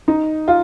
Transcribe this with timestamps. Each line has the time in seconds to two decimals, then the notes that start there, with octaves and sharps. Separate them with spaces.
0.08 D#4
0.48 F4